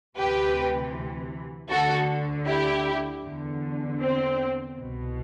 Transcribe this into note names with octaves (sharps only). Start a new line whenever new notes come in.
D2 C3 E3 G4 B4
D2 D3 F#4 A4
E4 G4
E2 D3
C4
C2 B2